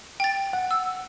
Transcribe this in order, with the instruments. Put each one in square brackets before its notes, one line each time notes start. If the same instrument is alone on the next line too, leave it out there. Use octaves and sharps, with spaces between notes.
[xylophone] G5 A6
[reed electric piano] F#5
[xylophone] E6